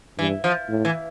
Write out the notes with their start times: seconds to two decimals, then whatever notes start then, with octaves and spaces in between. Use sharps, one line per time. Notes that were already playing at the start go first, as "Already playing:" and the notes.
0.18 G2 E3
0.44 F3
0.69 A2
0.85 E3